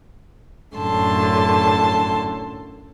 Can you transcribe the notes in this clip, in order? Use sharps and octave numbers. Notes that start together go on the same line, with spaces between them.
F#2 A2 D3 A5 C6